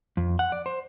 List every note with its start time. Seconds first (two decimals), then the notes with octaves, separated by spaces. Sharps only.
0.17 F2
0.39 F#5
0.52 D5
0.66 C5